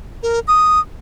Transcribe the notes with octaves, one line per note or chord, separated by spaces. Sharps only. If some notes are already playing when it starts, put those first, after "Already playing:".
A#4
D#6